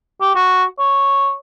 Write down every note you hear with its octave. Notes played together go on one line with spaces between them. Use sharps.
G4
F#4
C#5